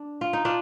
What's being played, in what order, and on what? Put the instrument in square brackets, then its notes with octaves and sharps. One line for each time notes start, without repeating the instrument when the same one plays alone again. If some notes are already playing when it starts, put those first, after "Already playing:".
Already playing: [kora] D4
F4
D#4
D4 F4